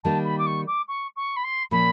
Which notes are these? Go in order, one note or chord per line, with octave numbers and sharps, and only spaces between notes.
D#3 G3 A#3 D#4 A5
B5
D6
C#6
D6
C#6
C#6
B5
C6
A#2 F3 A#3 C#4 B5